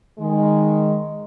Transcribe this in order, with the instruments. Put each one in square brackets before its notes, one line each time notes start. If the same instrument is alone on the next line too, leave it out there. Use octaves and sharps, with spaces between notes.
[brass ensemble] D#3 G#3